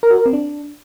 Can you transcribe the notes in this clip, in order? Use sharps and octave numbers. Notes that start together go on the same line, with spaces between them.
A#4
F#4
A#4
C4
D4